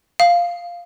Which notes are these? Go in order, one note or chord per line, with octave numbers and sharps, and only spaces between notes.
F5